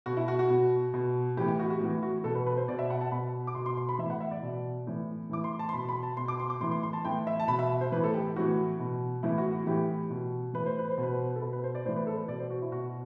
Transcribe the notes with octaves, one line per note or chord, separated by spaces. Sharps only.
B2 F#4
E4
F#4
F#4
B2
B2
A2 E3 G4
G4
F#4
F#4
A2 E3
F#4
B2 A4
B4
B4
C5
B2 D5
E5
F#5
A5
B2 B5
D6
B2 C6
C6
C6
B5
E3 E5
A2
F#5
E5
D5
B2
A2 E3
A2 E3 D6
C6
A5
C6
B2 B5
B5
A5
B2 C6
D6
C6
D6
A2 E3 C6
C6
C6
A5
A2 E3 G5
E5
A5
B2 B5
E5
C5
A2 E3 B4
A4
G4
A2 E3 F#4
B2
A2 E3 E4
F#4
F#4
A2 E3 G4
B2
A2 E3 B4
C5
B4
C5
B2
B4
A4
B2 B4
B4
C5
D5
A2 E3 C5
B4
A4
B4
B2 D5
C5
F#4
E4
B2 F#4